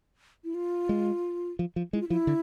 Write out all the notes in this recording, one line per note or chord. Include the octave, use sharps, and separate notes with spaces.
E4
F4
G#3
F3
F3
G#3 E4
F4
F3 E4
D3